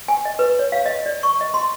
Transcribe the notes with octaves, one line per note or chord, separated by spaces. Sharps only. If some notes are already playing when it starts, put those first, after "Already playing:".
G#5
D#5
B4
C#5
F5
D#5
D5
C#6
D#5
C6